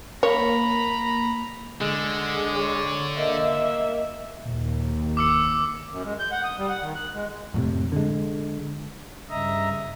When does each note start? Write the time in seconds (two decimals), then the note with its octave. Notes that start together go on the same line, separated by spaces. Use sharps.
0.23 A#3 C#5 A#5 B5
1.81 D3 G#3
2.51 C#5
3.18 A#3 D#5 E5
4.45 D#2 A#2
5.17 F1 D6 E6 C#7
5.91 F#2
6.04 G#3
6.19 G6
6.32 F#5
6.44 D#6
6.58 G3
6.69 F#5
6.82 D#3
6.95 F#6
7.15 G#3
7.54 F2 A2 C3
7.92 D3 G#3
9.29 G2 C#3 D#5 E5 A#5